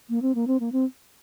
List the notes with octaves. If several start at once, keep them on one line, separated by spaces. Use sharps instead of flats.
A#3
C4
A#3
C4
A#3
C4